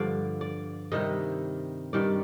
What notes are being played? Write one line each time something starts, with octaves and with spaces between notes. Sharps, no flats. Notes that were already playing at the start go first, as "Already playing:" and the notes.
Already playing: G2 D3 F3 D5
D5
C3 D#3 G3 D#5
G2 D#3 G3 D5